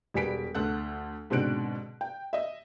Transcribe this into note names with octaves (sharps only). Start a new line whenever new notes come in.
E1 G3 B3 G#5 B6 D7
D2 A4 F#5 F#6
G#2 B2 D3 C4 F#6 D7
G5
D#5 E5